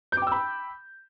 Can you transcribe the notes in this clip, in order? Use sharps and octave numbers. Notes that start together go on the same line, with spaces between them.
G5 B5 D6 E6 G6